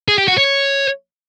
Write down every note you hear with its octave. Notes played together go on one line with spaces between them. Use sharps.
G#4
G4
F#4
C#5